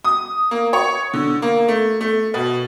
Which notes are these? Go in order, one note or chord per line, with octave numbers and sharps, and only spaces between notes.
D#6
A#3
C#5
D3
A#3
A3
A3
B2